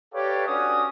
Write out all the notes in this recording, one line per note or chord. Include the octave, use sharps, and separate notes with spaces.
G4 A4 B4 C#5 D5 F5
C#4 D4 F#4 D#6